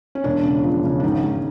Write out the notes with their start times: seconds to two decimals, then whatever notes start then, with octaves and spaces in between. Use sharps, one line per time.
0.15 C#4
0.24 E1 D4
0.44 C#3
0.63 F3
0.84 C#3
1.00 D4
1.04 G#1 D#4
1.23 G#1